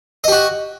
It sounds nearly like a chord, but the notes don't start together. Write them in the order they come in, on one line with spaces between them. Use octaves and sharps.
D#5 G4 F#4